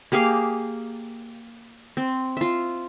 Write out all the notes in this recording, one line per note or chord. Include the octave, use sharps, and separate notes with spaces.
A#3 G4 G#4 F5
C4
F4 E5